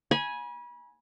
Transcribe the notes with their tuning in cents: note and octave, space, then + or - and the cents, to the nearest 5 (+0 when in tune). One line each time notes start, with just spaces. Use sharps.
G#5 +0 B5 -35